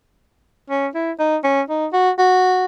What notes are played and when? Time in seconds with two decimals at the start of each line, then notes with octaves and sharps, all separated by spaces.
0.70 C#4
0.95 E4
1.19 D#4
1.44 C#4
1.69 D#4
1.93 F#4
2.18 F#4